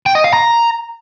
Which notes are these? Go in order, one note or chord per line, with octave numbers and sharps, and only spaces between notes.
G5
D#5
F5
A#5